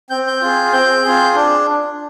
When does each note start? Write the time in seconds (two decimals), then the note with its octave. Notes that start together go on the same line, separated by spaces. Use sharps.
0.10 C4 G6
0.27 G6
0.41 F4 G#4
0.72 C4 G6
1.04 F4 G#4
1.35 D4